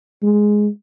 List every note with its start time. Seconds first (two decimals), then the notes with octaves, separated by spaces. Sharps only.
0.23 G#3